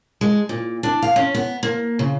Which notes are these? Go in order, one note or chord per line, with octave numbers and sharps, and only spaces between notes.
G#3
A#2
D4
F5
C#4
B3
A#3
C#3